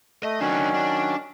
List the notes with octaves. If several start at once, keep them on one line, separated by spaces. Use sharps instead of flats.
A3 D#5
D#3 F#3 C#4 D4 F#4
D4